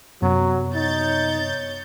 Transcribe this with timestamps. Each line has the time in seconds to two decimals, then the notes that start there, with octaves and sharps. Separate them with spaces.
0.22 F#2 C3 F#3 B3
0.74 D#4 C#5 G6 A6